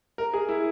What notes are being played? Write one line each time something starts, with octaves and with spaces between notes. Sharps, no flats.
A#4
G#4
E4